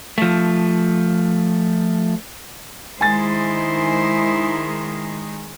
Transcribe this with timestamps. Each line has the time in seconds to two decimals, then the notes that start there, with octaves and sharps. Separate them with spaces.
0.18 F3 A3
3.01 D#3 G#3 E4 C5 G#5 A6